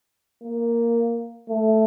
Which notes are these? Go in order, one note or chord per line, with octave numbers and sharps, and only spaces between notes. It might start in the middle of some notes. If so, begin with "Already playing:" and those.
A#3
A3